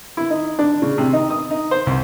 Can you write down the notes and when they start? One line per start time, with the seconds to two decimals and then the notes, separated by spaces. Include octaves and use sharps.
0.17 E4
0.30 D#4
0.59 D4
0.82 C#3
0.98 C3
1.13 D#4
1.30 D#6
1.51 D#4
1.71 C5
1.87 C2